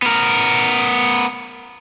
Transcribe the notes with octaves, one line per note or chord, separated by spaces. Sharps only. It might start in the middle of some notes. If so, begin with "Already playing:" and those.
B3 A#4